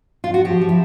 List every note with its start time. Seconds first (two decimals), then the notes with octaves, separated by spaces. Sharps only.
0.24 F4
0.34 F#4
0.45 F3 G4
0.61 F3
0.69 E4